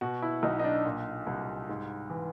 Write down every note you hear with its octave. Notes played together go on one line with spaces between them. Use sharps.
B2 F#4
E4
B1 D#4
D#4
D4
A#2
C2
G#2
E3